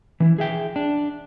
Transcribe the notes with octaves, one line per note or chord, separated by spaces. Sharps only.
E3 C#4 E4
G#4 E5 G5
D4